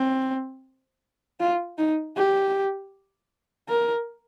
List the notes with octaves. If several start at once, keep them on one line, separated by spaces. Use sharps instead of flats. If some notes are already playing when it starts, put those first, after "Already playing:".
Already playing: C4
F4
D#4
G4
A#4